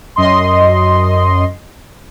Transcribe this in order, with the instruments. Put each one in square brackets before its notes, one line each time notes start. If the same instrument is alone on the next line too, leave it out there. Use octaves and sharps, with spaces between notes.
[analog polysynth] F#2 D#5 C6